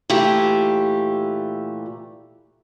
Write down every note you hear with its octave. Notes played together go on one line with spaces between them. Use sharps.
A#2 E3 A3 G4